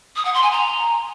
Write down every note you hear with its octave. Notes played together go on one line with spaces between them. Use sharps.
D#6
F#5
C6
G#5
A#5